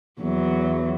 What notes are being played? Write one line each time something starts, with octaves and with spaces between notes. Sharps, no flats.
E2 F#3